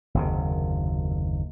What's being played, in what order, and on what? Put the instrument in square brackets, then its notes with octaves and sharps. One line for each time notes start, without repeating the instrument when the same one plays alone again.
[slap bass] F#1 D#2 C3